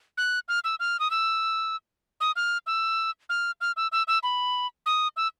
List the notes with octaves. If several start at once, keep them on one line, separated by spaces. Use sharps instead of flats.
F#6
F6
E6
F6
D#6
E6
D#6
F6
E6
F6
F6
E6
E6
E6
B5
D#6
E6